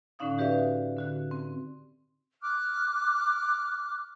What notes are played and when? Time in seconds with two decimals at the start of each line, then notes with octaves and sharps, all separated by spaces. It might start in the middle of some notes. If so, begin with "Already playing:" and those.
0.19 A2 D3 C#4 D#4 F5 D#6
0.38 F#4 G4 B4 D5 E5 F5
0.59 F#4
0.97 D3 F#4 F#6
1.31 C4
2.42 D6 F6 F#6